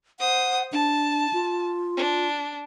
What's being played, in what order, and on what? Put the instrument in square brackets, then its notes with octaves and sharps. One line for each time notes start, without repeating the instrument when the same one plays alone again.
[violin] C5 D#6 [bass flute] F#5
[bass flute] D4 [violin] A5
[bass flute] F4
[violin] D4